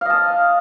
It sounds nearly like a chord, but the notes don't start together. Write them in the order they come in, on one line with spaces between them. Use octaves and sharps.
F5 D#5 A5